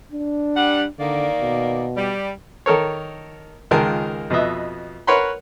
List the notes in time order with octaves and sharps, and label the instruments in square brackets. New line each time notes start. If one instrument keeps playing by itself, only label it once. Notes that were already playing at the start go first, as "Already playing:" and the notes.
[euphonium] D4
[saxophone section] G3 F#5
[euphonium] D3 [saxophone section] D#3 A#3 D5
[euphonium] B2
[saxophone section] G3
[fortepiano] D#3 A4 A#4 C#5
C#2 D#3 G#3 F4 A#4 A5
F2 B2 B4 D#5 E5
A#4 B4 C#5 F#5 B5 C6